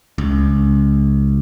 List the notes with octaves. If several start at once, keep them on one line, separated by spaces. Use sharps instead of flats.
C#2